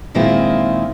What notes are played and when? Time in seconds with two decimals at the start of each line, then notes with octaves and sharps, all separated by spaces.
0.14 A#2 D#3 G#3 C4 E4 F4